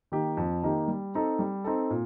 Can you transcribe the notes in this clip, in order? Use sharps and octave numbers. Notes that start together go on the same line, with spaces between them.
D#3 A#3 D#4 G4
F2
D#3 A#3 D#4 G4
G3
C4 D#4 A4
G3
C4 D#4 A4
A#2